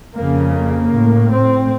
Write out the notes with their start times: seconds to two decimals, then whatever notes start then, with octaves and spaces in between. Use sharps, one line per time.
0.16 F2 C#3 A#3
0.55 A#3
0.93 A2
1.31 C4